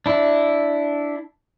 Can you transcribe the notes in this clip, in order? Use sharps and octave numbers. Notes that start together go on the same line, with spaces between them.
D4 E4